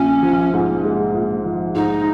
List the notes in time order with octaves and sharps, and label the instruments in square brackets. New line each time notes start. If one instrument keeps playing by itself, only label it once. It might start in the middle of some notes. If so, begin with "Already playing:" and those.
Already playing: [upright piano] A#1 [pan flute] C#4
[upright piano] F3
G#2
G#3
A#1
F3
[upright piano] G#2 [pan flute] D#4